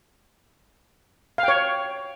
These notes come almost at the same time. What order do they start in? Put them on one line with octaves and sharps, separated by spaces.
F5 G5 C#5